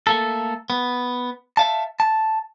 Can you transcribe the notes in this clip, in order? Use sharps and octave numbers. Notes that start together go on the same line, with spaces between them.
A3 A#3 A4
B3
E5 F5 A5
A5